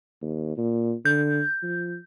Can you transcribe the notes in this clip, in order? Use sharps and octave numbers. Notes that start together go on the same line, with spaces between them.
D#2
A#2
D3 G6
F3